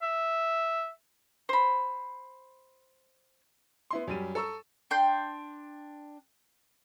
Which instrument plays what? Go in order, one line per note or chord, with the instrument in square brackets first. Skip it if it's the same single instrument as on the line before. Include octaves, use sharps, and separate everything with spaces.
[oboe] E5
[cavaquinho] C5 B5
[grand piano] B3 E4 C6
F#2 G3 D#7
A4 A#5 C#6 E6
[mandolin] D4 G5 C6 G6